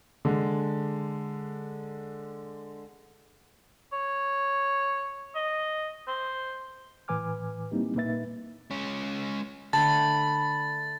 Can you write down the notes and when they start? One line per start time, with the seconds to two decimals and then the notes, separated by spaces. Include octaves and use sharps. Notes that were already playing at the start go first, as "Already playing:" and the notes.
0.25 D3 G#3
3.93 C#5
5.35 D#5
6.08 C5
7.08 A2 E3 B4 G#5 D6 F6
7.71 G3 A#3 C4 D#4 E4 G4
7.95 A#2 A#3 D#4 B4 E5 A6
8.71 G#3 C#4
9.73 D3 A3 G5 A5 B5 A6